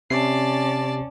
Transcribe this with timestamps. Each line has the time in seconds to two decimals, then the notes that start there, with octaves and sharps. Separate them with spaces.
0.10 C3 C#4 D5 A5 C7